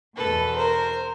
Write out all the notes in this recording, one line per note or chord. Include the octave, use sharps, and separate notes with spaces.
E2 B2 A4 B4
A#4 C5